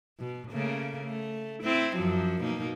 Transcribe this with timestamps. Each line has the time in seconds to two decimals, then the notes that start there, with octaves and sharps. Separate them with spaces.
0.19 B2
0.52 C#3 A3 A#3
1.05 A3
1.63 C4 E4
1.96 F#2 F3 F#3
2.42 B2 A#3 D#4